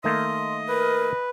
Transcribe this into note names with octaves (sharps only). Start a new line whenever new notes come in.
D#3 A3 A#3 D#5 C6
A#4 B4